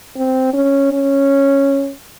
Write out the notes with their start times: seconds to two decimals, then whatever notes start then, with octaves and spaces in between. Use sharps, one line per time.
0.16 C4
0.53 C#4
0.92 C#4